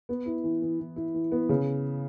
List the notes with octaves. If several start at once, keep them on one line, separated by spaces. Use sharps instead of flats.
B3
E4
E3
E3
E3
E4
E3
B3
C#3